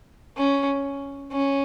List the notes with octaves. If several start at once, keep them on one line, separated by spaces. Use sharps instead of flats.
C#4
C#4